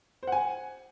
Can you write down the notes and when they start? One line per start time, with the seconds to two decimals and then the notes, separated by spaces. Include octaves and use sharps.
0.23 C5
0.27 F#5
0.32 G#5